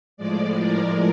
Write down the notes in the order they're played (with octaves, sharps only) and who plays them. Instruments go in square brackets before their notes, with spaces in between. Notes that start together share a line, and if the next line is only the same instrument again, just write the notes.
[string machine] A2 F3 G#3 D5
A#4